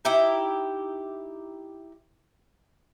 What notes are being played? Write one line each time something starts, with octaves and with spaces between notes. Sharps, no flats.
D#4 E4 G4 G5